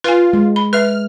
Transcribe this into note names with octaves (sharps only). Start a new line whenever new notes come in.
F4 B4 G#5
G#3
B5
B4 E5 F6